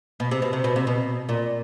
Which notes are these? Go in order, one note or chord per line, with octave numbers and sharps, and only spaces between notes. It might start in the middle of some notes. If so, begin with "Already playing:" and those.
B2
C3
B2
C3
B2
C3
B2
A#2